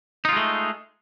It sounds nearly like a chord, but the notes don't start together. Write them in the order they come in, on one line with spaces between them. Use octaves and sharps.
D#4 F4 G#3 A3